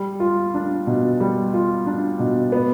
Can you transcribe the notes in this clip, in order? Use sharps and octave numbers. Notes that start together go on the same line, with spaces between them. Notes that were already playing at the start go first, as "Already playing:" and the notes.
Already playing: G3
F4
D4
B2
G3
F4
D4
B2
B3